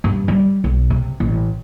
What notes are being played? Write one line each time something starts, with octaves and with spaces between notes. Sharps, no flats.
G2
G3
B1
C3
A1